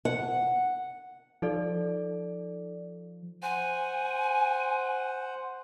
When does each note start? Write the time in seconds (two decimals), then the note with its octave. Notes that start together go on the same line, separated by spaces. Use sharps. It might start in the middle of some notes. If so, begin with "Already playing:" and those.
0.05 F#5
1.42 F3 D#4 A4 D5
3.42 C5 F#5 G#5